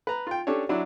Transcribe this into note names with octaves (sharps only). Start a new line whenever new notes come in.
B4 A#5
F4 G5
C#4 D4 G4 A4 C#5
F#3 D4 E4